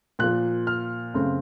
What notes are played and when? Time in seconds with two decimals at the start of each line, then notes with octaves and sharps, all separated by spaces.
0.19 A#2 F3 A#3 F#6
0.67 F6
1.14 F#2 C#3 A3 C4